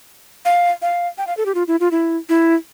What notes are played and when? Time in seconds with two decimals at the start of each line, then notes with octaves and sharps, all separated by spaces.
0.45 F5
0.82 F5
1.18 G5
1.27 F5
1.37 A4
1.46 G4
1.55 F4
1.68 E4
1.80 F4
1.91 E4
2.29 E4